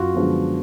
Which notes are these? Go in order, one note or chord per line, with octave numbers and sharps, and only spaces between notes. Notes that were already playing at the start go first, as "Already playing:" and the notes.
Already playing: F#2 F4 F#4
D3 F3 G#3 B3